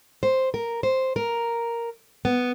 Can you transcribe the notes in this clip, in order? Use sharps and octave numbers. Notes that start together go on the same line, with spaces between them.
C5
A#4
C5
A#4
B3